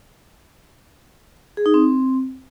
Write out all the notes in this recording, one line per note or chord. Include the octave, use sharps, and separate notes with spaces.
G#4
D#4
C4